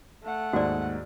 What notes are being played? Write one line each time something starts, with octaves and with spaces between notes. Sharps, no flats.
A3 F#5
D#2 G#2 F#4 C5 D5